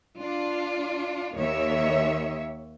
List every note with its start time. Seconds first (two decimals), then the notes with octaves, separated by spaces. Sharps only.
0.19 D4 F4
1.35 D#2 D#3 C#5 E5